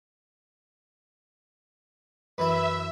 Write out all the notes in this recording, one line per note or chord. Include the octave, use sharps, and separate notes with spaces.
F#2 E3 E4 B4 E5